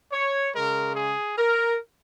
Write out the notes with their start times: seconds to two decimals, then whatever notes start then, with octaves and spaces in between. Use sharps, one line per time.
0.12 C#5
0.54 C#3 G#3 A#4
0.96 G#4
1.38 A#4